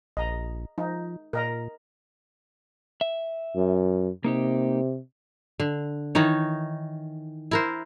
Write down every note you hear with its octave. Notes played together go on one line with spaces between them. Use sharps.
A#1 D#5 A#5
F3 D#4
A#2 A#4 D#5 A#5
E5
F#2
C3 A#3 D#4 G4
D3
D#3 E3 D#4 C#5
E4 A#4 C5